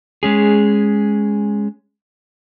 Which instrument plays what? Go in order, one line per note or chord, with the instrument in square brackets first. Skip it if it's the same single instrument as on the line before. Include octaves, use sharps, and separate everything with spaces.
[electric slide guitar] G#3 C#4 G#4